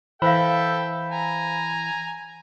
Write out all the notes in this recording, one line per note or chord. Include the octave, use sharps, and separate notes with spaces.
E3 A4 C5 E5 F5 G5 B5
G#5 A#5